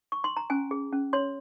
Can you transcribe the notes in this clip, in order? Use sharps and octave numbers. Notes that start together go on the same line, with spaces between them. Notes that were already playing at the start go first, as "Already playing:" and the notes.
C#6
C6
A#5
C#4 G#5
G#4
C#4
C#5 C6